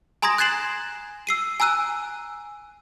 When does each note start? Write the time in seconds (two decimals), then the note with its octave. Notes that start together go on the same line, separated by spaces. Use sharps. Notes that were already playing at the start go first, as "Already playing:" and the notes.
0.22 G#5 A#5 C6 D#6 G#6 A#6
0.38 F#6 G#6 A6 C7 E7 F#7
1.27 E6 C7 D#7
1.60 G#5 A#5 E6 F#6 D#7